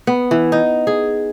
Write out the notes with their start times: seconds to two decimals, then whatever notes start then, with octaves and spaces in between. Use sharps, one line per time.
0.07 B3
0.31 E3
0.52 D#4
0.87 G#4